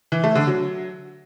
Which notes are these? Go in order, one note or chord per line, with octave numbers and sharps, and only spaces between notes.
E3
A3
D3
F#3